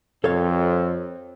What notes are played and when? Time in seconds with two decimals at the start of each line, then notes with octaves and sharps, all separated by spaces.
0.24 F2 C4 A4 C#5 F5